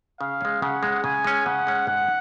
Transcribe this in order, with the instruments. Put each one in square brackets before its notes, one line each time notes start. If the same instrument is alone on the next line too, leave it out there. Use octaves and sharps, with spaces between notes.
[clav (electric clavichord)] C#3 [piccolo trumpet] F5
[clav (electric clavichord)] G#3 C#4
[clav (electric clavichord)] C#3 [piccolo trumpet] F#5
[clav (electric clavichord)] G#3 C#4
[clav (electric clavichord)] C#3 [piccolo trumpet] G#5
[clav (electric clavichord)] G#3 C#4
[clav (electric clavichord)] C#3 [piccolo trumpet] F#5
[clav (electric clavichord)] G#3 C#4
[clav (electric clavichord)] G#2 [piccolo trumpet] F#5